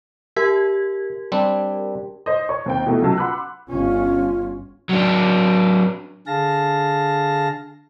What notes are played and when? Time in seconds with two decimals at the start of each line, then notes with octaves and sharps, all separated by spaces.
0.36 G4 A#4 E5
1.32 G3 C4 D4
2.26 C5 D#5
2.49 C#5 C#6
2.66 D#2 C4 G5
2.86 B2 E3 A3
3.02 C#2 C#3 F#3 A5 E6
3.18 F#5 B5 C6 D6 F#6
3.68 G1 C#4 F4
4.89 F#3 D4
6.27 D3 G#4 F5 A5 A#6